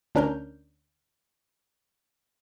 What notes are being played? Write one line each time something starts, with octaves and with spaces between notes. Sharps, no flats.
D2 C#4 D4 A#4 F6 G6